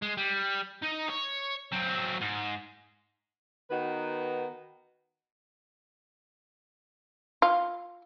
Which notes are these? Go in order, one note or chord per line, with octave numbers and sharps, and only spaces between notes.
G#3
G3
D#4
C#5
F#3 C4
G#2
D#3 B3 D#4 F#4 B4
F4